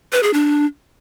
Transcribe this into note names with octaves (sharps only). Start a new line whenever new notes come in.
B4
G#4
D4